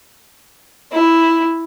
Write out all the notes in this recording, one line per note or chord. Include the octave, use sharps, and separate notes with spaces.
E4